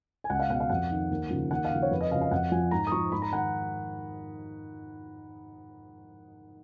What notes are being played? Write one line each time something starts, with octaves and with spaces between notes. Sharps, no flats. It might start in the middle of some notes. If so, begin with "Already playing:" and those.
G#5
C#2 F#5
F5
B2 F#5
F5
F2 F#5
D#3
D#2
C#3 F3
D#2 F#5
F5
C#3 F3
C#5
F2 B4
D#5
C#3 F3 F5
F5
F2 F#5
F3 G#5
G#2 A#5
D#6
F3 C#6
G#2 B5
A#5
D#3 F#5